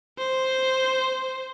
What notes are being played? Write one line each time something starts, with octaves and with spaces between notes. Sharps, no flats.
C5